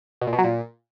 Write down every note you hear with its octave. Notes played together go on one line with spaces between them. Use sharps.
B2
A#2
B2
F#3
A#2